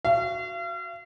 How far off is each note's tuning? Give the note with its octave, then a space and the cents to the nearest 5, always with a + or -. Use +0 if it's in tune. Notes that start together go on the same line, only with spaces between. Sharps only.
F#4 +0 F5 -40